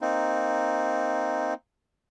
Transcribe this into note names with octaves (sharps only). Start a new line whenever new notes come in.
A#3 C4 D#4